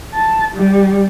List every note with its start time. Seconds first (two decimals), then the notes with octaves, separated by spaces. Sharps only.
0.14 A5
0.56 G3